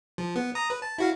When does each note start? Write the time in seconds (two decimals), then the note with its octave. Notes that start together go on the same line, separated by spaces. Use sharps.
0.18 F3
0.36 B3
0.55 A#5 D#6
0.70 B4
0.82 A5
0.98 E4 F#4 F5